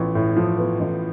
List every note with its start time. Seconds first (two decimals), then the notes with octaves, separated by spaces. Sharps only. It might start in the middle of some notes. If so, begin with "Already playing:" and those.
Already playing: A1 F3 B3
0.15 A2
0.36 F3
0.59 B3
0.80 A1